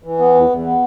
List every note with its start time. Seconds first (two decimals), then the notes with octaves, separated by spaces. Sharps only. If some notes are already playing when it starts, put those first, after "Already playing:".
0.03 E3
0.18 B3
0.34 E2
0.49 E2
0.64 B3